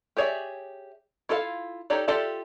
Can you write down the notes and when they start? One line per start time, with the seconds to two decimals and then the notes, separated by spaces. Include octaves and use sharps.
0.17 G4 G#4 C#5 D5 E5
1.29 E4 F4 A4 E5 F5
1.90 D#4 G4 A4 C#5 D5
2.08 F4 G4 A4 D5 E5